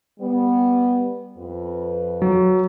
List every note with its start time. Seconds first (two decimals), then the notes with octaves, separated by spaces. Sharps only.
0.20 G3 B3
1.37 F2 B4
2.22 F#3